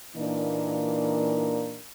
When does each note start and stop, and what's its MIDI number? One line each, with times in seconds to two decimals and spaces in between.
0.16 1.79 46
0.16 1.79 52
0.16 1.79 58
0.16 1.79 62
0.16 1.79 63
0.16 1.79 70